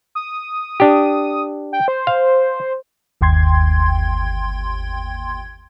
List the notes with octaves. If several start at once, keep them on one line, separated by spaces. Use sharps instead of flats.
D#6
D4 G4
G5
C5
F5
G1 D#2 G5 C6 G#6